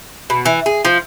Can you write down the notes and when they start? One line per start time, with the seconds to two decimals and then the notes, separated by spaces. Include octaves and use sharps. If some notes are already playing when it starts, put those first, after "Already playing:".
0.30 B2
0.46 E3
0.66 G#4
0.85 F3